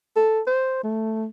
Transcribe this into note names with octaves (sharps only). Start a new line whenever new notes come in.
A4
C5
A3